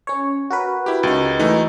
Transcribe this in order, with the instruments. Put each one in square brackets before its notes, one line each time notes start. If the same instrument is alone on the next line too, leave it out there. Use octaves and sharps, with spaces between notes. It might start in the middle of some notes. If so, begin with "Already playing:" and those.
[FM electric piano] C#4 C#5
F#4 A#4 B4
[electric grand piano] E4 G4
C#2 D#4
E3 A3 D#4